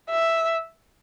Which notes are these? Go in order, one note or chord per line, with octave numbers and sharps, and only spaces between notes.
E5